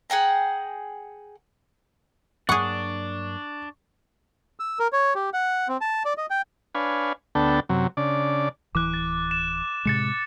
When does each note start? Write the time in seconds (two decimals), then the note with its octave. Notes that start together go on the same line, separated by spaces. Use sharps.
0.10 G#4 F#5 G5 A#5
2.49 G2 F#3 A#3 D4 G#4 F#5 C#6
4.60 E6
4.79 A#4
4.93 C#5
5.15 G4
5.34 F#5
5.68 C4
5.81 A5
6.05 D5
6.18 D#5
6.30 G5
6.75 D4 B4 C#5 F5 G#5
7.35 D2 B3 D4 A4 G5
7.69 F#2 C3 F#3
7.97 C#3 D4 D5
8.75 D1 E3 D6 F#6
8.94 A6
9.31 E7
9.85 A2 C3 G#3 A6 C#7 E7